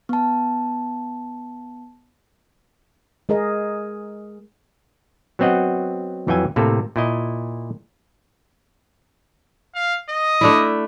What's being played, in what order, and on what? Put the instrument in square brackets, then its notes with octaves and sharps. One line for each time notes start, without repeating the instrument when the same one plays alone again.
[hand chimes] B3 A5
[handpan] G#3 G#4 A#4 D#5
[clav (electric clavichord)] F#3 B3 C4 F#4 D#5 F#5
F2 E3 F#3 G5 G#5
A2 C3 A#3 A4
A#2 E4 D#5
[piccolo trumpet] F5
D#5
[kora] A3 D4 E4